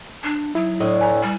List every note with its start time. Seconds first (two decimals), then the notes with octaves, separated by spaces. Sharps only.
0.24 D4
0.55 F#3 D#4 E4
0.80 A2 D4 D#5
0.99 B4 G#5 A#5
1.23 G3